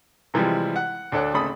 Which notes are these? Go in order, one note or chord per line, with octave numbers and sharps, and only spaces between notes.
C3 E3 F3 G3 G#3
F#5
D2 D4 A4 C#5 F#5
G#1 C#3 A3 A4 B5 D#6